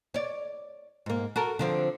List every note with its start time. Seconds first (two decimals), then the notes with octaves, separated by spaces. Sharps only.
0.14 C#5 D5
1.06 G#2 A#3
1.36 F#4 A4 A#4
1.59 D3 F3 C4